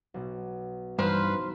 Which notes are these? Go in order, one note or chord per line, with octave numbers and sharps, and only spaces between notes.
B1 B2
G2 E3 D#4 B4 C5 F5